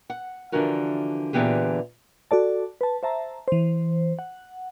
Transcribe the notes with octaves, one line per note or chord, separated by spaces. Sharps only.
F#5
D3 E3 F3 D4 F#4 A#4
A#2 D3 E3 B3 G4 G#4
F#4 A4 D5 A5
B4 A5
C5 E5 A5 A#5
E3 C5
F#5